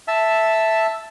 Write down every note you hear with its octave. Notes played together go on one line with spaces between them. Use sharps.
E5 A5